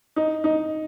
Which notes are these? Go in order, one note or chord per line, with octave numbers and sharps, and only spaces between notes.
D#4
D#4